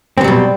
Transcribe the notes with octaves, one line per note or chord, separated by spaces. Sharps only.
B2 F#3 G3 C4